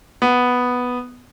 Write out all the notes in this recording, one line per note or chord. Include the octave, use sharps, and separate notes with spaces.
B3